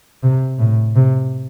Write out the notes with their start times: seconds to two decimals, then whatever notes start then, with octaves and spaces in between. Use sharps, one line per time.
0.23 C3
0.59 A2
0.95 C3